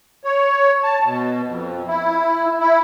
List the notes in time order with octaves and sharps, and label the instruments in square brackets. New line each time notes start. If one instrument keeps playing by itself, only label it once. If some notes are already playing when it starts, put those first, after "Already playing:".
[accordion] C#5
A5
B2
F2
E4
E4